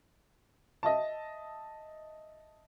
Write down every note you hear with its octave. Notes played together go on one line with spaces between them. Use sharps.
D#5 E5 A5